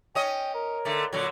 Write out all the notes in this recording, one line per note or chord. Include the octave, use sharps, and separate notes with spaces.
C#4 D#5 G5
A#4
D3 A3
A#2 D3 F#3